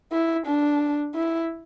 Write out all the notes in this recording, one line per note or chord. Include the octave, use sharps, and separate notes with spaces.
E4
D4
E4